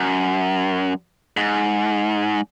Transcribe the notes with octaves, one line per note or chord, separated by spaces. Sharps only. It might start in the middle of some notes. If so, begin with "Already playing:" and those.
Already playing: F#2
G#2